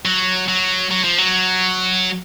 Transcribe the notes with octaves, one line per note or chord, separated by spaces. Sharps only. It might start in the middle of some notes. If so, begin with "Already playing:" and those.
F#3
F#3
F#3
F3
F#3